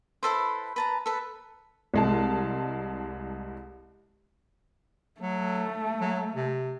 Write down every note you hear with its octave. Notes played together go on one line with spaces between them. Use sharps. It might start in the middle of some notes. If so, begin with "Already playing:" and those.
E4 A4 B4 C5
B4 A5 A#5
A4 B4
C2 G#3 A5
F#3 A3
F#3
C3